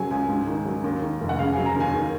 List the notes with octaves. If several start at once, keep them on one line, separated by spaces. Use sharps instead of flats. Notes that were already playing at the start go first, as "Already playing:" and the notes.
Already playing: C#3 F#3 G#5
C#2 G#5
G#2
D#3
F#3
D#2
D#3
F1
F#5
C#3 F5
F#3 G#5
A#5
D#2 G#5
D#3